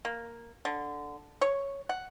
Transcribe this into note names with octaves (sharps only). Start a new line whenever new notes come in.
A#3
D3
C#5
F#5